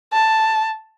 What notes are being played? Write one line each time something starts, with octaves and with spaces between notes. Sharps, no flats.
A5